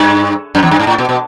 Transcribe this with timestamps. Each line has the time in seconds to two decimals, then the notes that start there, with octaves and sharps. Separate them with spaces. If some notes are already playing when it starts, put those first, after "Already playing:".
Already playing: G2
0.55 F#2
0.63 E2
0.71 G2
0.80 G#2
0.87 A2
0.98 B2
1.09 B2